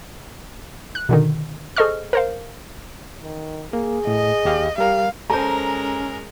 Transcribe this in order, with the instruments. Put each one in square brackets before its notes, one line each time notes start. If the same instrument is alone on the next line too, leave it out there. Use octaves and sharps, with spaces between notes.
[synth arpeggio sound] F#6
B2 D3 D#3
G#4 A4 C5 D#5 C#6 F6
A#4 C5 F5
[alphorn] D#3
[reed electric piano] A#3 [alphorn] G#4
[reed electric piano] A2 [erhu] D#5
[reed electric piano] D#2 G4 F5
[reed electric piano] G3 A#4 [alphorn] G4 [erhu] F5
[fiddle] G#3 A#4 [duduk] C#4 [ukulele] A4 C5 [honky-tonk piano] A#5